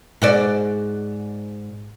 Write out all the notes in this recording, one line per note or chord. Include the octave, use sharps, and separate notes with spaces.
G#2 F#4 D5